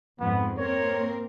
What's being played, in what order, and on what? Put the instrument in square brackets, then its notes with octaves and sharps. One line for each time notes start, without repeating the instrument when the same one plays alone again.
[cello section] F2 G#2 [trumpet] B3
[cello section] A#3 C4 A#4 [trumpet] C#5